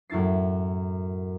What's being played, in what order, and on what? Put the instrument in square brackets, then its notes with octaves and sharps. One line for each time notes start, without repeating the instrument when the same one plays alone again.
[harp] F#2 A2 E4 A6 C7